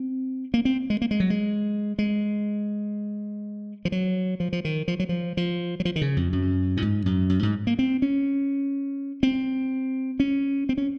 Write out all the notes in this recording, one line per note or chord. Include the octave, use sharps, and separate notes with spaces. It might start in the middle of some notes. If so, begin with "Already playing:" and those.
Already playing: C4
A#3
C4
G#3
A#3
G#3
F#3
G#3
G#3
F3
F#3
F3
F3
D#3
F3
F#3
F3
F3
F#3
F3
D#3
C#3
F2
F#2
A#2
G#2
F#2
F#2
G#2
A#3
C4
C#4
C4
C#4
C4
C#4